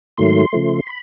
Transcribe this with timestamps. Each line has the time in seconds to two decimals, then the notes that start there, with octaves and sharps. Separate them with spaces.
0.18 G#2 D#3 F#3 A3 C6
0.53 C#3 F3 A3
0.87 B5